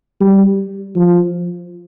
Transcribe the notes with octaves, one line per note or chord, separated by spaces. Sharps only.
G3
F3